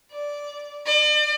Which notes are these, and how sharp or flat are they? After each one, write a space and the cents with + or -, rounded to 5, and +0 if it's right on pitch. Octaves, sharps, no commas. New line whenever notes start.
D5 -10
D5 +40